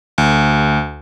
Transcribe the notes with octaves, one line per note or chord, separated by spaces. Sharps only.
D2